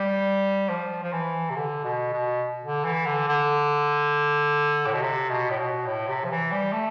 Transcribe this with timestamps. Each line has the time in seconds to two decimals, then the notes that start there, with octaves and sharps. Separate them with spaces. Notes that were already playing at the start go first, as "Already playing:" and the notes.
Already playing: G3
0.69 F3
1.03 F3
1.13 E3
1.50 C3
1.56 D3
1.84 B2
2.13 B2
2.64 D3
2.85 E3
3.06 D3
3.28 D3
4.86 A2
4.94 B2
5.01 C3
5.29 B2
5.50 A2
5.59 B2
5.87 A2
6.08 C3
6.24 F3
6.30 E3
6.52 G3
6.73 A3